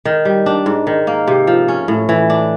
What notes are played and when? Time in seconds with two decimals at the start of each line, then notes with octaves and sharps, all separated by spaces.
0.05 D#3
0.25 G3
0.46 D4
0.66 G#2
0.87 D#3
1.07 A#3
1.27 C3
1.47 F3
1.68 C#4
1.88 A2
2.09 E3
2.30 D4